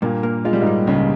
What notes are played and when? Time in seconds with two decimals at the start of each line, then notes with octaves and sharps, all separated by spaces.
0.02 G2 A#2 A#3
0.23 A#3
0.45 G#3 F4
0.53 G3
0.61 G#2 G#3
0.67 G3
0.87 C#2 G2 C#3